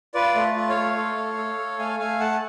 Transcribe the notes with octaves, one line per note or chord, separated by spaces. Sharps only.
F4 B4 D5
A3
F4
C#5 F5
A3
A4
A3
A4
A4
A3 F5 G#5
A3 F5 G#5
A3 F#5 A5